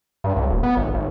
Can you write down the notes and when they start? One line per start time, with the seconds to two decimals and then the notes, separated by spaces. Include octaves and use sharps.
0.24 G2
0.36 C#2
0.49 D#1
0.63 B3
0.77 G#1
0.94 G#1